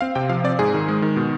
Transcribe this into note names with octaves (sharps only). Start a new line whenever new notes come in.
C4 F5
C3 G5
F3 F5
C4 D5
G#2 G#4
D#3
G#3
D#3
B2